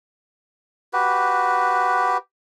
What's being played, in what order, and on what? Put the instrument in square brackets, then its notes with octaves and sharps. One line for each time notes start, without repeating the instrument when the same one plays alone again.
[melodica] F#4 G4 B4